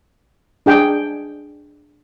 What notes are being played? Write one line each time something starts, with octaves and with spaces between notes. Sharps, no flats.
D4 G#4 G5